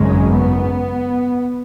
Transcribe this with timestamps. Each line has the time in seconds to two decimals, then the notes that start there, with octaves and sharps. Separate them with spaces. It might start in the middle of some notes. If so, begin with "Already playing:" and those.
Already playing: G#1 F#2 C#3 G#3
0.32 B3